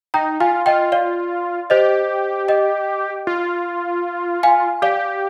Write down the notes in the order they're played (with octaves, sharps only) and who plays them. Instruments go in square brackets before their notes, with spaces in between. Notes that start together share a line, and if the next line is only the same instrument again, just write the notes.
[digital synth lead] D#4 [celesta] G5 A#5
[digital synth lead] F4 [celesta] F5 G#5
[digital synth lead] F4 [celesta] D#5 G5
[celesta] D5 F5
[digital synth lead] G4 [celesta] C5 D#5
[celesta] D#5 G5
[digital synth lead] F4
[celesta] F5 G#5
[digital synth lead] G4 [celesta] D5 F5